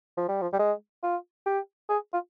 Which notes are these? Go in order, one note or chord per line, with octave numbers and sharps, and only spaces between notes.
F3
G3
F3
G3
G#3
F4
G4
G#4
F4